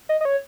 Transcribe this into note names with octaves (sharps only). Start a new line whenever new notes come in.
D#5
D#5
C#5